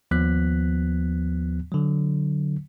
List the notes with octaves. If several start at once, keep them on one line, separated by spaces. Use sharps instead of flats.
D#2 F3 B3 F#6 B6
D3 F#3